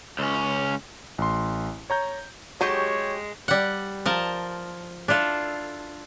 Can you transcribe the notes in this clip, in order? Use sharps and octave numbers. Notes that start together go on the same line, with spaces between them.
C#2 C#4
A1 C6
C#5 A#5 G6
F#3 G#3 D#4 F#4 G4 C#5 A5
G3 F#5
F3 A#4 A5
D4 E4 F4 A4